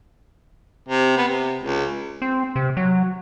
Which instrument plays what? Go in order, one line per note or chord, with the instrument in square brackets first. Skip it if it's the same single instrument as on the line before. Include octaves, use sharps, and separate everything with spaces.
[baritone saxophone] C3
B3
C3
C#2
[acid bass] C4
C3
F#3